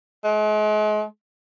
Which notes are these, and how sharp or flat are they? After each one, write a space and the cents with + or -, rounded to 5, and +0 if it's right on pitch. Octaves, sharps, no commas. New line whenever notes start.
G#3 +40